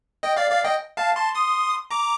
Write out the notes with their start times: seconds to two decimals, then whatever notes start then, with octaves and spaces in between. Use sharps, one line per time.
0.23 D#5 G5
0.36 D5 F5
0.51 D5 F5
0.64 D#5 G5
0.97 F5 A5
1.16 A5 C6
1.35 C6 D#6
1.91 A#5 D6